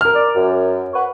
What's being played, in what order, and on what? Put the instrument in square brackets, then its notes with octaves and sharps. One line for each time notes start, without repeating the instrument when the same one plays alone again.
[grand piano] A#4 F6
[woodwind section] D5
F#2
B4 F#5 C#6